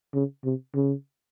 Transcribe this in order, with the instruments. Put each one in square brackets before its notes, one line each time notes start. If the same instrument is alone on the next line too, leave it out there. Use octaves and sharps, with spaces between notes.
[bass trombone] C#3
C3
C#3